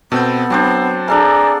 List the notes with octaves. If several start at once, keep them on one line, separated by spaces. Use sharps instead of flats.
B2 B3 C4 A4 G6
F#3 C4 D4 C5
D4 G#4 A4 D5 F5 G#5 A#5